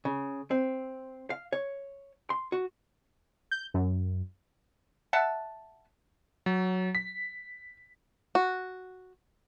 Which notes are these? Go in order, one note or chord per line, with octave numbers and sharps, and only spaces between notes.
C#3
C4
F5
C#5
C6
F#4
G6
F#2
E5 F#5 A5
F#3
B6
F#4